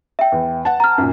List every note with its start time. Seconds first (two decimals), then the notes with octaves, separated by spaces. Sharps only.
0.19 E5 G5
0.32 E2
0.65 F#5 A5
0.80 A#5 F6
0.98 F#2 A#2